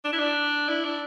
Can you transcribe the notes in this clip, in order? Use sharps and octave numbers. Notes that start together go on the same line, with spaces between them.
D4
E4
D4
E4
D4